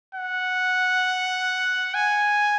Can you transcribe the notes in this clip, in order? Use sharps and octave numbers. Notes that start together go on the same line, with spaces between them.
F#5
G#5